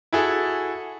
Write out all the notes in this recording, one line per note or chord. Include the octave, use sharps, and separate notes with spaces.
E4 F#4 G#4 A4